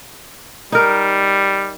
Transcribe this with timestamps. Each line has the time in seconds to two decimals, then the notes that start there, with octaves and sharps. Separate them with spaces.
0.72 G3 D#4 A#4